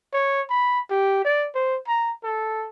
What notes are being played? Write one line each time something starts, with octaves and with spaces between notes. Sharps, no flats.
C#5
B5
G4
D5
C5
A#5
A4